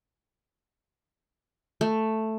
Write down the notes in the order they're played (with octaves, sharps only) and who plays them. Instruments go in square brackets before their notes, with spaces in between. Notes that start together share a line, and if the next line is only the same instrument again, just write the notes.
[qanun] A3